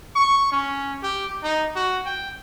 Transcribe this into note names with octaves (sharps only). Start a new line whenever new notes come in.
C#6
C#4
G4
D#4
F#4
G5